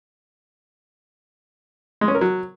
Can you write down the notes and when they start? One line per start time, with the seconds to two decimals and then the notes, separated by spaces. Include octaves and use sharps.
2.01 G#3
2.08 C#4
2.15 A#4
2.21 F#3